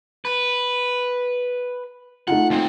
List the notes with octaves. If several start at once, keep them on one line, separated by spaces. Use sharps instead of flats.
B4
A3 D#4 F4 F#5
D#2 C4